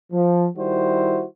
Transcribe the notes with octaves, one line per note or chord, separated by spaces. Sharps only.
F3
D#3 G3 E4 F#4 C5